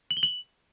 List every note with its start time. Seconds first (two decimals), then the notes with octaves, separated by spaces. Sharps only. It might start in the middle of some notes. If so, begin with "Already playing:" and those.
0.11 F#7
0.17 G7
0.23 F#7